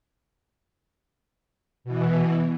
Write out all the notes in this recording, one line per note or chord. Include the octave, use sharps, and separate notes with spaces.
B2 E3